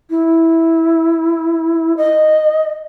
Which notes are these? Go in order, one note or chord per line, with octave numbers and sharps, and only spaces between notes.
E4
D#5